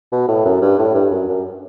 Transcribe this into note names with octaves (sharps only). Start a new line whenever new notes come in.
B2
A2
F#2
G2
A2
G2
F#2
F#2